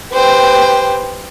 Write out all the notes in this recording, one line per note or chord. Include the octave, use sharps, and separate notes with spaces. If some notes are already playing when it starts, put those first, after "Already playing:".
G4 B4 C5 G5